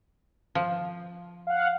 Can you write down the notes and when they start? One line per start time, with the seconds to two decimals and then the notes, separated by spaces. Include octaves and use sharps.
0.55 F3
1.47 F5 F#5